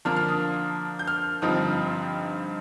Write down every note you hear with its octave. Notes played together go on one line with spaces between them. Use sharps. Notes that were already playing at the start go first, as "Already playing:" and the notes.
D3 F3 A#3 D4 F6
F6
D#6
G6
F6
G2 D3 F3 C4 D#4 D#6